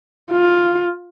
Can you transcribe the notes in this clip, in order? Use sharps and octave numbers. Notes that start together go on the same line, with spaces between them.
F4